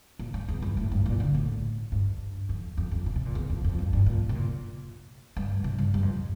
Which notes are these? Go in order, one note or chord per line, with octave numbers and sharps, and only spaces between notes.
A#2
G2
E2
G2
A2
G2
A#2
D3
A2
G2
F2
F2
F2
A#2
C3
A#2
E2
F2
F2
G2
G2
A#2
C3
A#2
G2
C3
G2
G2
F2